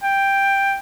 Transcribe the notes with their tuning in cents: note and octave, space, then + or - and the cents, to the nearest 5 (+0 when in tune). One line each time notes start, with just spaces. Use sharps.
G5 +5